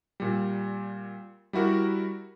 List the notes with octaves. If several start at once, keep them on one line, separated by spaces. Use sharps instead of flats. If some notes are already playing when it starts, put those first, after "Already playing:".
A#2 G3
G3 E4 F#4 A#4